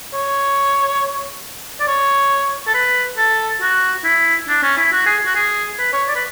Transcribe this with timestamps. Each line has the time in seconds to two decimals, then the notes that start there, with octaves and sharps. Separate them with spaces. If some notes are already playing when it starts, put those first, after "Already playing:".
0.14 C#5
1.80 D5
1.87 C#5
2.67 A4
2.74 B4
3.17 A4
3.61 F#4
4.04 E4
4.48 D4
4.63 C#4
4.77 E4
4.92 F#4
5.06 G#4
5.26 F#4
5.35 G#4
5.79 B4
5.93 C#5
6.08 D5
6.15 B4